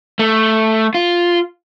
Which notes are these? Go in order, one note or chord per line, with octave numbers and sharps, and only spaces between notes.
A3
F4